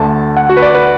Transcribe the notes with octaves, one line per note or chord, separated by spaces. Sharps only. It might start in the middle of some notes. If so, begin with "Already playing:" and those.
Already playing: D2 D3 A3 A5
F#5
F#4
B4
D5
B4